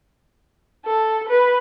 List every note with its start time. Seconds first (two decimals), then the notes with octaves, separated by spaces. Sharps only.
0.85 A4
1.28 B4